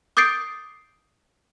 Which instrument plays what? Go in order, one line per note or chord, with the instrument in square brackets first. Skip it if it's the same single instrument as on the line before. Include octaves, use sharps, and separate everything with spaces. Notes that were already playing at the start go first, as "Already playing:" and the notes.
[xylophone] D6 D#6 G6 A6 C7 D7